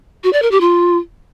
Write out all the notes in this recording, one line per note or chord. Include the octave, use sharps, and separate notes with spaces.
F#4
D5
A#4
G4
F4